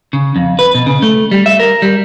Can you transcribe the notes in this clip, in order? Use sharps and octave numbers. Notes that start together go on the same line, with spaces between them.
C#3
F2
B4
B2
C#3
A3
G3
E5
A#4
G3